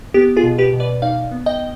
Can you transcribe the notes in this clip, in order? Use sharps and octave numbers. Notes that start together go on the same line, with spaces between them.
B3 G4
F4 G#4
B2
G4 B4
B2
B4 D5
D#4 D5 F5
B3
D#5 G5